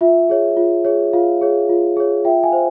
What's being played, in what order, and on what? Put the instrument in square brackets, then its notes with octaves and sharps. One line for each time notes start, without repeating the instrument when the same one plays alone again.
[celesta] F4 E5
G#4 C#5
F4
G#4 C#5
F4 F5
G#4 C#5
F4
G#4 C#5
F4 E5 G5
F5 G#5
C5